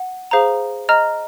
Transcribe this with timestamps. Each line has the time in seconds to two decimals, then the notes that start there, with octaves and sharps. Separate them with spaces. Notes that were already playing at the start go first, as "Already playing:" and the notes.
Already playing: F#5
0.31 G#4 C5 F5 A#5
0.89 D#5 A#5 F6